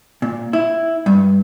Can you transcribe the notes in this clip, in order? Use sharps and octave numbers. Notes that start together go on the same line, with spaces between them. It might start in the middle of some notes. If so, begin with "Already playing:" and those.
A#2
E4
G2